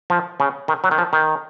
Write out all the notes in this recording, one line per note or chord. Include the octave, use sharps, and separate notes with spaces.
F3
C#3
D#3
F#3
D#3
F3
D#3